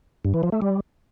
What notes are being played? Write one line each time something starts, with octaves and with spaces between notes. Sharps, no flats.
G2
E3
F3
A3
G3